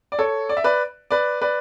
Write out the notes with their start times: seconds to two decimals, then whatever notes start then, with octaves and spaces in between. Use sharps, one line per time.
0.12 D5
0.19 A4 C#5
0.49 D5
0.57 E5
0.64 B4 D5
1.11 B4 D5
1.42 B4 D5